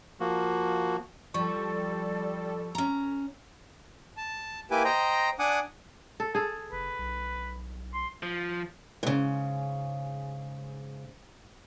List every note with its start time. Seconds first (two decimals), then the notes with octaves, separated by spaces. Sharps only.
0.20 F3 A#3 F#4
1.34 F3 G3 A4 D5 C#6
2.75 C#4 A#5
4.17 A5
4.71 A#3 E4 G4 B4 G#5 D6
4.84 C5 D#5 G5 A#5
5.39 D4 F#5 G#5 D6 D#6
6.20 A4
6.35 G#4 A4
6.72 F#1 B4
6.98 B1
7.94 C6
8.23 F3
9.03 G#2 C#3